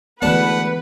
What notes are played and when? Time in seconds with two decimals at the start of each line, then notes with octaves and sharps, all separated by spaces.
0.22 D2 E3 G#3 B3 D4 B4 F#5 A5